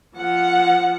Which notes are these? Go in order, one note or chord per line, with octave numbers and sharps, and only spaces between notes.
F3 F#5